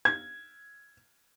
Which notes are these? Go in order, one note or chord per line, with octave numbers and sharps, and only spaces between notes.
G#6